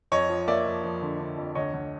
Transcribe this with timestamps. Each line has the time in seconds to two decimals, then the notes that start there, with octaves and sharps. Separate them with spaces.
0.12 F2 C#5 D#5
0.29 F3
0.48 A#3 D5 E5
0.66 F3
0.84 F3
1.02 D3
1.19 D3
1.37 F2
1.55 D2 C#5 D#5
1.73 D2